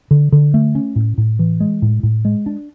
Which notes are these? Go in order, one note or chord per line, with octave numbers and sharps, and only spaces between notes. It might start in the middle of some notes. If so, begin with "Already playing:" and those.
D3
D3
A3
C#4
A2
A2
E3
G#3
A2
A2
G#3
D4